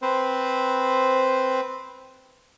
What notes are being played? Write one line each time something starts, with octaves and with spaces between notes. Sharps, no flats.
C4 B4 C5